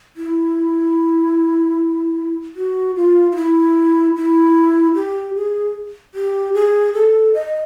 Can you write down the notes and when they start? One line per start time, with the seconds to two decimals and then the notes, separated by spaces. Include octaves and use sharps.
0.17 E4
2.56 F#4
2.96 F4
3.32 F4
3.36 E4
4.16 E4
4.95 G4
5.35 G#4
6.14 G4
6.54 G#4
6.94 A4
7.34 D#5